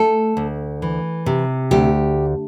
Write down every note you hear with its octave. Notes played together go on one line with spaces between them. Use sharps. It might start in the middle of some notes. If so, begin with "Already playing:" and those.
Already playing: A3 A4
D2
E3
C3
D2 G4